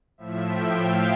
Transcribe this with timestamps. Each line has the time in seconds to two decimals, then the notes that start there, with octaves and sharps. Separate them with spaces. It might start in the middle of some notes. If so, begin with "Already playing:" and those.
0.18 A2 F3 E5
0.46 G5
0.75 F5